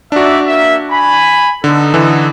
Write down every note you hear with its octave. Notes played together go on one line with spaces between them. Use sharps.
D4 D#4 F#4 D5 E5
A#3 E5
G#5 B5
D3 B3 D#4 A4
D3 E3